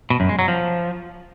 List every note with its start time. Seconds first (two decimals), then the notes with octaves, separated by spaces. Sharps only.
0.10 B2
0.20 F#2
0.29 G#3
0.39 F#3
0.48 F3